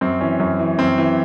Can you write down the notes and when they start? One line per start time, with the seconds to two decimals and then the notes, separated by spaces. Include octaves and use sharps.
0.01 F#2 C4
0.21 E3 C#4
0.40 F#2
0.59 E3
0.79 F#2 C4
0.98 E3